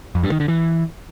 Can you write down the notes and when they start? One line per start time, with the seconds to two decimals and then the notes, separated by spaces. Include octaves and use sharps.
0.15 F2
0.23 G2
0.32 D#3
0.40 D3
0.48 E3